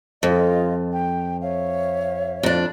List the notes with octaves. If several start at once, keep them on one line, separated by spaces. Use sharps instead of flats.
F2 F4 D#5
G5
C#5 E5 F5
F2 D4